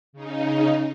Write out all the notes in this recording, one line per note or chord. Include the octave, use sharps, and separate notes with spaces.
C#3 D#4